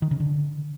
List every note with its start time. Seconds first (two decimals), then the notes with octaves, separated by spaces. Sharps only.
0.02 D#3
0.11 C#3
0.20 D3